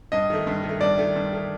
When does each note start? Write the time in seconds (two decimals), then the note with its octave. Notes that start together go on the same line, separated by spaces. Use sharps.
0.12 G2 D#5
0.30 D#3 A3
0.47 G2
0.64 D#3
0.69 A3
0.81 G2 D5
0.98 D#3 A3
1.16 G2
1.33 D#3 A3